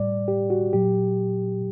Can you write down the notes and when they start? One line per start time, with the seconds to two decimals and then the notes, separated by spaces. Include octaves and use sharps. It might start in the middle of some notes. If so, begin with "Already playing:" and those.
Already playing: A2 G3 D5
0.28 G4
0.50 F#4
0.73 A#2 F#3 G4